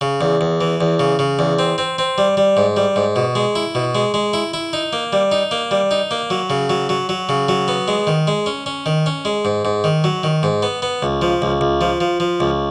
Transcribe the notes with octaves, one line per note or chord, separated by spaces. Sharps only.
C#3
E2
E2
E3
E2
C#3
C#3
E2
C4
C4
C4
G3
G3
G#2
G3
G#2
B2
G#3
E4
B2
G#3
G#3
E4
E4
D#4
A#3
G3
D#4
A#3
G3
D#4
A#3
F#3
C#3
F#3
F#3
F#3
C#3
F#3
B3
G#3
D#3
G#3
C#4
C#4
D#3
C#4
G#3
G#2
G#2
D#3
F#3
D#3
G#2
B3
B3
C#2
F3
C#2
C#2
F3
F3
F3
C#2